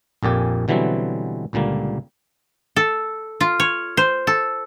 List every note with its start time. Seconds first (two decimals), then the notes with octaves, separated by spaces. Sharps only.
0.23 A#1 F2 A#2 G4 G#5
0.68 B2 D3 E3 F#3 G3 C4
1.53 C#2 A#2 D3 G3 A#3
2.76 A4
3.41 F4
3.60 C#5
3.97 C5
4.27 A4